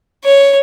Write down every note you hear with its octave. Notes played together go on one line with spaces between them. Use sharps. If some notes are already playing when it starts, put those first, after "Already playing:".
C#5